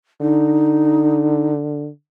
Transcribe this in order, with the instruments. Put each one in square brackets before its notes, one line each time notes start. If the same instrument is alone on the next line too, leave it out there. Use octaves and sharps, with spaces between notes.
[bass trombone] D3 [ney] D#4